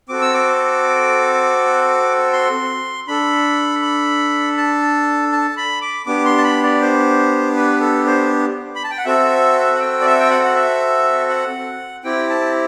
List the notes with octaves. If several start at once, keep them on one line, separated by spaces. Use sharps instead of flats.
C4 F#4 A4 D6
E6
D6
C6
D4 A4 B5
B5
A5
A5
B5
D6
B3 D4 G4 D6
C6
A5
B5
D5
C5
B4
A4
C5
B5
A5
G5
F#5
C4 F#4 A4 E5
F#5
G5
D5
E5
G5
F#5
F#5
E5
F#5
C4 E4 G4 G5
A5